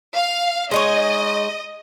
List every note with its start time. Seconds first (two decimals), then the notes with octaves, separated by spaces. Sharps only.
0.15 F5
0.71 G#3 D#4 C#5 D#5